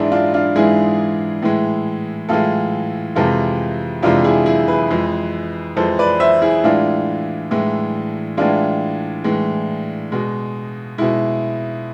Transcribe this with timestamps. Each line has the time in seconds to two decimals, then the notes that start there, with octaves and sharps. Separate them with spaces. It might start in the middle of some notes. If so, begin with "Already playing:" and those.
Already playing: G#2 E3 G#3 D4 E4
0.12 D4 F4
0.34 D4 F4
0.56 G#2 E3 G#3 E4 G#4
1.42 A2 E3 G#3
2.29 A2 E3 G#3 F4 A4
3.16 F2 C3 E3 G#3 F4 A4
4.02 F2 C3 E3 G#3 D4 F4
4.24 E4 G#4
4.46 E4 G#4
4.68 G#4 B4
4.90 F2 E3 G#3
5.77 F2 E3 G#3 A4 C5
5.99 B4 D5
6.20 C5 E5
6.42 E4 G#4
6.64 A2 E3 G#3 D4 F4
7.51 A2 E3 G#3
8.37 A2 E3 G#3 D4 F4
9.24 A2 E3 G#3
10.12 B2 G#3
10.98 B2 G#3 E4